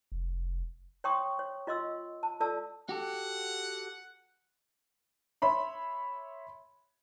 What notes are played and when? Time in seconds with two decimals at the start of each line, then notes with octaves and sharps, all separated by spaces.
0.12 F1
1.04 C#5 G5 C6 C#6 D#6
1.39 C#5
1.67 F4 D#5 C6 E6
2.23 A5
2.40 F4 A4 D5 A5 E6
2.89 F#4 G4 A4 F#5
5.42 C#5 E5 B5 C6